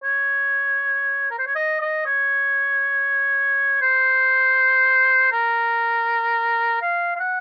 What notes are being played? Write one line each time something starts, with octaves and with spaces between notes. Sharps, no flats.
C#5
A#4
C5
C#5
D#5
D#5
C#5
C5
A#4
F5
F5
F#5